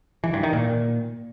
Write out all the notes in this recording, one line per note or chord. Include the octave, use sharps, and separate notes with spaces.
E3
G2
D#3
A#2